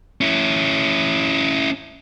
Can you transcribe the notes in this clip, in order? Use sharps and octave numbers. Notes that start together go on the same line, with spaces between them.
C#4 E4